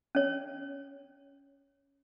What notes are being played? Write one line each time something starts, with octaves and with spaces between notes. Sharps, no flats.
C#4 C#5